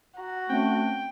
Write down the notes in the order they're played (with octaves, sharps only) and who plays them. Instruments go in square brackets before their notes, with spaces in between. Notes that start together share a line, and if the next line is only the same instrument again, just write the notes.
[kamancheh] F#4 [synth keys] A#5
[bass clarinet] A3 [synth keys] C4 C#4 [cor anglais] G5